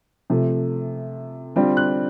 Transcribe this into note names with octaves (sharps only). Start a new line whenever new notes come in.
C3 F3 A3
D3 G3 C4 F4
F#6